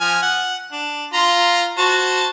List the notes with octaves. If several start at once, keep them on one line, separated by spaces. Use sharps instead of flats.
F3 G#5 F6
F#5
D4
F4 A#5 C6
F#4 C5 A5